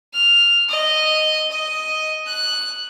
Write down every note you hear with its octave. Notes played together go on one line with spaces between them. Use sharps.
F6
D#5
D#5
F#6